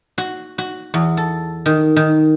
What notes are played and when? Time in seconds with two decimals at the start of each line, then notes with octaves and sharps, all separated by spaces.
0.18 F#4
0.58 F#4
0.94 E2
1.17 A4
1.66 D#3
1.96 D#3